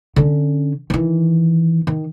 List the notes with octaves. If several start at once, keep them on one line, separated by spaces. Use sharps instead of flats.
D3 C#4
D#3 E3
D#3